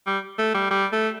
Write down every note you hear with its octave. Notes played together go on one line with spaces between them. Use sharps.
G3
A3
G3
G3
A3